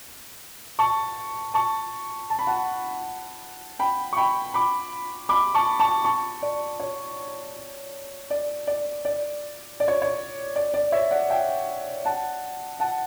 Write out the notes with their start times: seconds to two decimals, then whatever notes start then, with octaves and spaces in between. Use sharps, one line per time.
0.79 A5 C#6
1.54 A5 C#6
2.30 A5
2.39 B5
2.47 F#5 A5
3.79 G5 B5
4.13 C#6
4.17 G5 B5
4.54 B5 D6
5.29 B5 D6
5.55 A5 C#6
5.80 A5 C#6
6.04 A5 C#6
6.42 D5
6.80 C#5
8.30 D5
8.67 D5
9.05 D5
9.80 D5
9.88 C#5
10.02 C#5
10.56 D5
10.74 D5
10.92 C#5 E5
11.11 D5 F#5
11.30 E5 G5
12.05 F#5 A5
12.80 F#5 A5